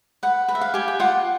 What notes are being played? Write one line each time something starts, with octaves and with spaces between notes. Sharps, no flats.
B4 F#5
B4
E5
F5
G4 G#5
G5
F4 F#5